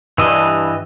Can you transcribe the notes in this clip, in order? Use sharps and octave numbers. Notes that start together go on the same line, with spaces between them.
G2 E3 D#5